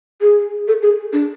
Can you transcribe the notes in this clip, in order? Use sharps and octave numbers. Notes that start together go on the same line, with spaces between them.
G#4
A4
G#4
D4